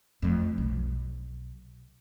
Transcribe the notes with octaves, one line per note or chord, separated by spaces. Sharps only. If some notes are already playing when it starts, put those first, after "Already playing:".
F2 A3
B1